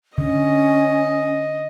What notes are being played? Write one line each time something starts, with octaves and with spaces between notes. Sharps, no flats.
D3 C#4 D#5